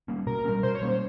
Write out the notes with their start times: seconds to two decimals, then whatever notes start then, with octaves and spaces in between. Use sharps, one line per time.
0.08 G3 A#3 C#4
0.27 B2 A#4
0.45 A#3 C#4
0.48 G3
0.63 B2 C5
0.75 C#5
0.82 G3 A#3 C#4
0.88 C5